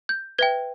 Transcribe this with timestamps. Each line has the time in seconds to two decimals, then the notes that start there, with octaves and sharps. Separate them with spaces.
0.09 G6
0.38 B4 E5 G5 G#6